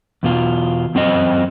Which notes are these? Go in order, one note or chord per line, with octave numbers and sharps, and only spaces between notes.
E2 B2 F4
F#2 C4 C5 D#5